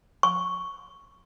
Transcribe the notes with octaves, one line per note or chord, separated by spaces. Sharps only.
C#6